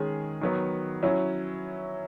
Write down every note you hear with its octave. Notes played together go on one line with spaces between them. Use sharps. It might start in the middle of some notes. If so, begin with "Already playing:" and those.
Already playing: D#3 G#3 C#4 G#4
D#3 F#3 B3
F#3 C#4 E4